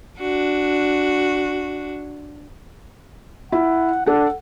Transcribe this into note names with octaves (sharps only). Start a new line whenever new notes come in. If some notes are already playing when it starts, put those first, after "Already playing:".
D4 F#4
E4 F#5
D4 A4 F#5